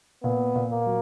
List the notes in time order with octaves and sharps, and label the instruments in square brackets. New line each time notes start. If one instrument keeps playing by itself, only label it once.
[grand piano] A#2 [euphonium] B3
[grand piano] A#2
[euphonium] A#3
[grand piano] F#3